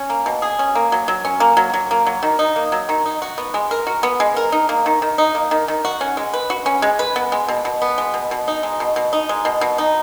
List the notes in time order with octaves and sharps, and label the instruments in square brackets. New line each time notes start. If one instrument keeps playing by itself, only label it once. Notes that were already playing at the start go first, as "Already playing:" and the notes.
Already playing: [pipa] C#4
A#3
B2
G#4
C#4
A#3
F#3
F#3
C#4
A#3
F#3
F#3
A#3
F#3
D#3
D#4
A#3
F#3
D#3
D#4
F#4
B3
G#3
A#4
F#4
B3
G#3
A#4
D#4
A#3
D#3
D#3
D#4
A#3
D#3
D#3
F#4
C#4
G#3
B4
F#4
C#4
G#3
B4
B3
G#3
B2
B2
B3
G#3
B2
B2
D#4
G#3
B2
B2
D#4
G#3
B2
B2
D#4